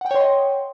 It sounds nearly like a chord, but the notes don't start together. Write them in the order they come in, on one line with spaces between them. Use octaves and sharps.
F#5 G5 C#5 C6 D#5